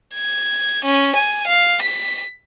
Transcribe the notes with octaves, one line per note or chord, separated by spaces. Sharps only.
G#6
C#4
G#5
F5
B6